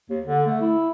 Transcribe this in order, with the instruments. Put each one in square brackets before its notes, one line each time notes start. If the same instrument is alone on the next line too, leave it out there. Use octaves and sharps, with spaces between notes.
[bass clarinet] D#2
D3
A3
E4